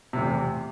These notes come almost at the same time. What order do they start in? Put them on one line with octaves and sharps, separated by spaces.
C3 A2 E2